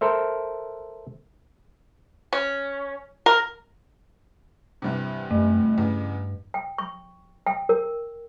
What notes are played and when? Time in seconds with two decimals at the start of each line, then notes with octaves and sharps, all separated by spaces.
0.01 A4 A#4 C5 E5
2.33 C#4
3.26 A#4
4.82 E2 G2 C3
5.31 F#2 A3
5.78 E2 G2 C#3
6.54 G5
6.78 C#6
7.47 G5
7.69 A#4